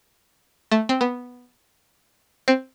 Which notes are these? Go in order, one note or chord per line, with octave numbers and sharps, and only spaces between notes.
A3
C4
B3
C4